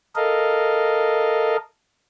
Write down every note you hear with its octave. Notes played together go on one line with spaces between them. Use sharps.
A4 A#4 D#5 F5